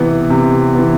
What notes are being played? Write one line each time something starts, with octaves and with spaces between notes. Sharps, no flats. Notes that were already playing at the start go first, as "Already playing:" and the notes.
Already playing: C3 E3 B3
C3
E3 B3